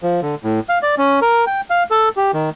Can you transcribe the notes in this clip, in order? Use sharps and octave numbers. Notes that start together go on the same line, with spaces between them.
F3
D3
A2
F5
D5
C#4
A#4
G5
F5
A4
G4
D#3